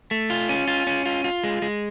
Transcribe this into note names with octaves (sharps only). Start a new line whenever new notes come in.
A3
F4
C#4
F4
C#4
F4
F4
G#3
G#3